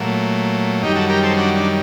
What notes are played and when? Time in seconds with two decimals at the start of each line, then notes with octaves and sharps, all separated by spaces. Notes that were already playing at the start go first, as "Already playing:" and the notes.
Already playing: A#2 F#3 A3
0.82 F#2 D#3 G3 D#4 G4
0.96 F#4 A4
1.10 G4 A#4
1.23 A4 C5
1.37 D4 F#4
1.55 D4